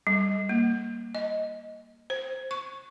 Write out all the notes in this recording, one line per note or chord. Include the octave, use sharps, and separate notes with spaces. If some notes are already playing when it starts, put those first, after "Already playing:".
G3
A#3
D#5
C5
C#6